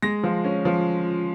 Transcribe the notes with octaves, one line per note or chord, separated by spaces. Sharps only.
G#3 A#6
F3
C#4
F3